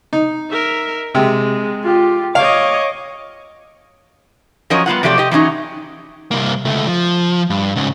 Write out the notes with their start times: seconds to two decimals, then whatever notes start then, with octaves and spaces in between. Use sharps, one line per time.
0.13 D#4
0.51 A#4 E5
1.15 C3 G#3
1.83 F4 G4
2.35 C#5 D#5 F5 D6
4.70 F3 F#3 C#4 A#4 C#5 D#5
4.86 G3 B3 F4 F#5
5.03 C3 F3 F#3 A3 G4 D5
5.18 G4 D#5
5.31 E3 F#3 C#4 D#4
6.31 C2 A#3
6.65 C#2 A3
6.87 F3
7.50 G2
7.76 G#2 C#3